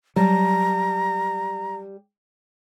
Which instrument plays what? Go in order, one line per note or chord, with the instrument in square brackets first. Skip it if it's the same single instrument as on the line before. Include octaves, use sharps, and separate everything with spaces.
[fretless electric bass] F#3 [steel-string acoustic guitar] G3 A5 [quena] A#5